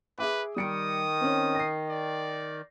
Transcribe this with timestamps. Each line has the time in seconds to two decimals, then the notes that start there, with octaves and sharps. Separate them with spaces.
0.19 G#4 B4 E5 D6
0.56 D#3 G3 D#6 C#7 D7
1.21 C4 C#4
1.55 A#6 C7
1.89 D5